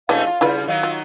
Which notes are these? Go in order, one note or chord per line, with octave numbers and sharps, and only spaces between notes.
B2 E3 G#3 A3 C#4 D4 F5
F4
C#3 G3 E4 F4 B4
D#3 F#3 D#4 F5
F4